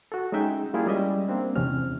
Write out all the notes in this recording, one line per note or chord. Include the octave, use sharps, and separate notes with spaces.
F#4 A4
G#3 C#4 D#4 E5 G5
G3 A#3 E4 F4 G#4
G3 G#3 C#4 D#5 E5
A#3 C4 D4
E2 G#2 C3 C#4 F6